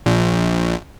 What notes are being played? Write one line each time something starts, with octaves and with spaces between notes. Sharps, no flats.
A#1